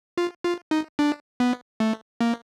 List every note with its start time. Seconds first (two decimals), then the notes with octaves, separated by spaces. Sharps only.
0.18 F4
0.45 F4
0.71 D#4
0.99 D4
1.40 B3
1.80 A3
2.21 A#3